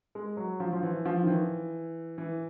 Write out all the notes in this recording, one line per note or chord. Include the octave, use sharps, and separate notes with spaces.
G#3
F#3
F3
F3
E3
F3
D#3
E3
E3